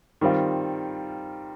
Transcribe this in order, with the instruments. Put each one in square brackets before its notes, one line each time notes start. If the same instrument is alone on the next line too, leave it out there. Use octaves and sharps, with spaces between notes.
[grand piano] D#3 G3 C4 F4